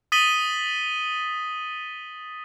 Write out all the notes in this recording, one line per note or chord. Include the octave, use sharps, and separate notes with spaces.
D#6 A6 B6 D#7 F#7 G7